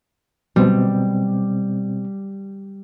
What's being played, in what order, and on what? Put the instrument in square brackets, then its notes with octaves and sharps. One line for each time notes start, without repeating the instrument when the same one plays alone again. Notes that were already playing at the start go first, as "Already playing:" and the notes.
[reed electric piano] B2 C4 [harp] G3